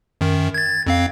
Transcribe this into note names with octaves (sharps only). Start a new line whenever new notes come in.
F#2 D#3
G#6 A6
F2 C4 F5